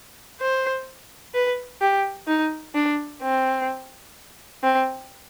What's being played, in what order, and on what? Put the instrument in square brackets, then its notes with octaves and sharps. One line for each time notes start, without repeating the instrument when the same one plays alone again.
[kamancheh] C5
B4
G4
D#4
D4
C4
C4